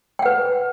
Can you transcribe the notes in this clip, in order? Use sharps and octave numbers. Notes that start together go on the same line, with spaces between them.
B4 F#5 G5